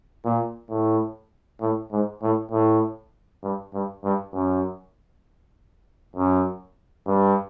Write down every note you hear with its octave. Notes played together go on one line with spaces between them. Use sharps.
A#2
A2
A2
G#2
A2
A2
G2
G2
G2
F#2
F#2
G2